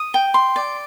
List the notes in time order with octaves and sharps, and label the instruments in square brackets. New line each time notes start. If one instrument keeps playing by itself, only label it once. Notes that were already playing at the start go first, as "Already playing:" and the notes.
Already playing: [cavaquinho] D#6
G5
C6
D5